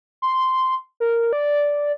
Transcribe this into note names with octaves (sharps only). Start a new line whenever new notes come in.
C6
A#4
D5